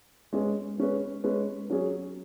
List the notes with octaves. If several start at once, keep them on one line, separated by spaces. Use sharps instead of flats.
G#3 C#4 G#4 B4
G#3 C#4 G#4 B4
G#3 C#4 G#4 B4
F#3 C#4 G#4